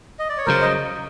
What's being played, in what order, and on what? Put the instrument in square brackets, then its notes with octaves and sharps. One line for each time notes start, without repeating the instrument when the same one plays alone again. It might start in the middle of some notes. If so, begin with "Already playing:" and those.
[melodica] D#5
D5
C#5
[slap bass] F#1 F#2 C#3 [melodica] A#4 C5
[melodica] D#5